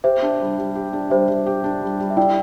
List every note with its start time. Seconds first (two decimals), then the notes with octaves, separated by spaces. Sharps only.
0.04 G4 C5 E5
0.22 D4
0.40 G3
0.58 G3
0.75 G4
0.93 D4
1.10 G3 C5 E5
1.28 G3
1.46 G4
1.64 D4
1.82 G3
2.00 G3
2.10 E5
2.17 E4 D5 G5